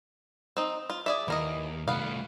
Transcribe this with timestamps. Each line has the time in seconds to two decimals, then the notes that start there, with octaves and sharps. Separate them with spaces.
0.57 C4 D#4
0.90 F4
1.06 G#4 D5 E5
1.28 D#2 E3 A#4 D#5
1.88 C2 A3 B3 F5